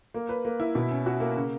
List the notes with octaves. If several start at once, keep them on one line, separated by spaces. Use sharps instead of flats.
A#3
B4
A#3
E4
B2
C#4
F#4
A#3
C#3